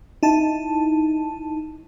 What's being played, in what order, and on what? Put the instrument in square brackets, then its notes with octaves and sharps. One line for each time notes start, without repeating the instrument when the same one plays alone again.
[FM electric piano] D#4 E4 A5